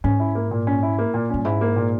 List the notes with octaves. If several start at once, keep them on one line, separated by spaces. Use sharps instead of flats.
G#2 C#4
E4
A#3
A#2
C#4
E4
A#3
A#2
G2 C#4
G#2 E4
A#3
A#2